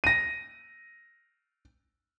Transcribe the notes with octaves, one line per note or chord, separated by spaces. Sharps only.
A#6 D#7